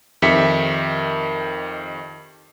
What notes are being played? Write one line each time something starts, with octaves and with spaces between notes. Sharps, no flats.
F2 D#3 G4 E5 B6 C#7